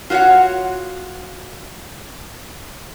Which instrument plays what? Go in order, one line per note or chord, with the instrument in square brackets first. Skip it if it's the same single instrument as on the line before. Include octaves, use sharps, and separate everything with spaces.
[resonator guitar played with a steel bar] F4 F#4 C5 C#5 F#5